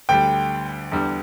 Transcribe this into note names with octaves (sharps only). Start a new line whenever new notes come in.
D2 D3 G3 G5
E2 D3 G3